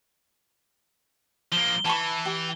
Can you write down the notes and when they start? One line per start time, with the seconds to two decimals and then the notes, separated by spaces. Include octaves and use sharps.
1.52 F3 A#3 G7
1.85 E3 A5 B5 C#6
2.25 G4